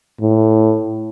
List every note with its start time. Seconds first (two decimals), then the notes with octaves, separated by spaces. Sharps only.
0.21 A2